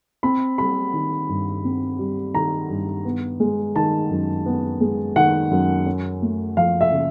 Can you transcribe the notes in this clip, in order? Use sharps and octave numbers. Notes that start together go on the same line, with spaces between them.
C4 B5
G3 B5
D#3
G2
C4
G3
D#3 A#5
G2
B3
G#3
D#3 A5
F#2
B3
G#3
D#3 F#5
F#2
C#4
A3
F3 F5
E5
C#3